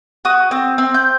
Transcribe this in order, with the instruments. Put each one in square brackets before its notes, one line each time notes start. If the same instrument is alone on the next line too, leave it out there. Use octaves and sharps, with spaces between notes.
[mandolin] F#4 D#6
C4
C4
G6